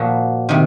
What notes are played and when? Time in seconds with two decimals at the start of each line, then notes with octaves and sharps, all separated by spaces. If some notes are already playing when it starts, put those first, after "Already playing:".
Already playing: A#2 F3 F#4 G#4
0.49 C3 D#3